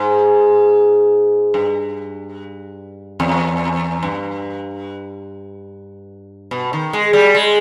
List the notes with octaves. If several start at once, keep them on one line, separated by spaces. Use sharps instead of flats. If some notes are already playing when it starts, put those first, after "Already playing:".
Already playing: G#2
G2
E2
G2
B2
D#3
G#3
G3
G#3